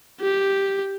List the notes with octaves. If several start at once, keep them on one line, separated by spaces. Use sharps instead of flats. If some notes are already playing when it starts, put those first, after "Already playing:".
G4